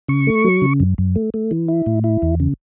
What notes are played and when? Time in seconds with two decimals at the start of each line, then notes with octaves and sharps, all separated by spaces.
0.08 C#3 C#6
0.27 A3
0.45 F#3
0.62 C#3
0.80 F#2
0.98 F#2
1.16 A3
1.34 A3
1.51 E3
1.68 E4
1.86 A2
2.04 E4
2.22 E2
2.40 C#3